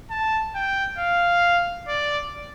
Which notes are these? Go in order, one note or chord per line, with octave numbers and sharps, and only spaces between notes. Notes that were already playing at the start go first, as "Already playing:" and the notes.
A5
G5
F5
D5